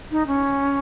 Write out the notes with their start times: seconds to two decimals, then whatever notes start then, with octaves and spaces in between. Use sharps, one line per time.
0.11 D#4
0.27 C#4